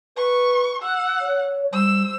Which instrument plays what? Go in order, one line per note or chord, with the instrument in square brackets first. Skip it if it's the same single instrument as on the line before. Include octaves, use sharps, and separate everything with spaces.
[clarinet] B4 [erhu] C#6
[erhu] F#5 [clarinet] E6
[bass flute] C#5
[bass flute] G3 [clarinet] C5 [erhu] E6